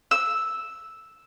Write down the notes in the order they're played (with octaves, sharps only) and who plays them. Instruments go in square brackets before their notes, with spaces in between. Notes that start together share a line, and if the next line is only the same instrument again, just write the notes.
[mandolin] E6